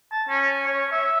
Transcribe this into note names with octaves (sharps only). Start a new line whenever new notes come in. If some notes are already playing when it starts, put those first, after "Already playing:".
A5
C#4
C#5
E5